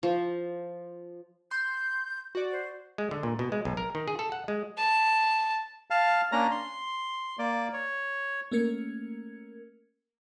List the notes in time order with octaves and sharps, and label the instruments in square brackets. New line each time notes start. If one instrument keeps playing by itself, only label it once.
[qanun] F3
[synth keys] C6 [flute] G6
[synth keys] F#4 D5
[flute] C5
[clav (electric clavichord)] G#3
D3
A#2
B2
G#3
B1
A#4
D#3
G#4
A4
F#5
G#3
[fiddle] A5
[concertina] F5 A5
A#3 C#4 D4 A#5
C6
A#3 D5
C#5
[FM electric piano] A3 A#3 C#4 A#4 G#6 C#7